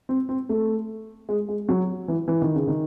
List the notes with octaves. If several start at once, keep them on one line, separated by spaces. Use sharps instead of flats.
C4
C4
A3
G#3
G#3
F#3
E3
E3
D#3
C#3
D#3